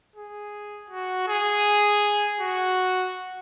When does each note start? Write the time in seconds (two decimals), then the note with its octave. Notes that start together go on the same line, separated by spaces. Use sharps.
0.16 G#4
0.90 F#4
1.28 G#4
2.40 F#4